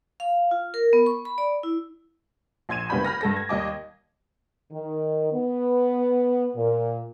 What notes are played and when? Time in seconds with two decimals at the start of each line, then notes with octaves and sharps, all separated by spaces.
0.20 F5
0.51 F4
0.74 A#4
0.93 B3
1.06 C#6
1.25 B5
1.38 D5
1.63 E4
2.69 A#1 C6 G#6 D#7 E7
2.89 F#1 G3 B3 D4 B5 G6
3.04 B5 F6 A#6
3.21 G2 A4 A#6
3.36 G#6
3.49 D#2 G3 D#5 D6
4.72 D#3
5.34 B3
6.56 A#2